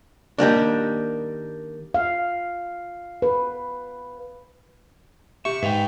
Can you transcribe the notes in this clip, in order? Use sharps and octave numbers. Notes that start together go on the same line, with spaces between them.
D#3 G3 A#3 D4
F5
B4
G4 E5 C#6
G#2 B4 F5 G5